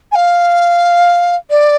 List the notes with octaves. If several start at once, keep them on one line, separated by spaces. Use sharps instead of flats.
G#5
F5
D5